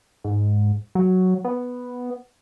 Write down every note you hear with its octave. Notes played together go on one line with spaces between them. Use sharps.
G#2
F#3
B3